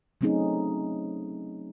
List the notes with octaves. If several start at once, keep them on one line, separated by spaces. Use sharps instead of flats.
F#3 A3 C4 C#4 D#4 G#4